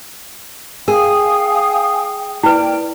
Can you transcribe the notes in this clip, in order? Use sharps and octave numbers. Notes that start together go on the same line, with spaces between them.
G#4 A#4 F5 G5 G#5 D#6
A#3 E4 B4 D5 G5